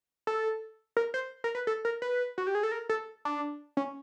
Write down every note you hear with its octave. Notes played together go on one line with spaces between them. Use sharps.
A4
A#4
C5
A#4
B4
A4
A#4
B4
F#4
G4
G#4
A4
A#4
A4
D4
C#4